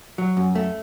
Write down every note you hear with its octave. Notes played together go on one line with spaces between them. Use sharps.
F#3
F#2
A3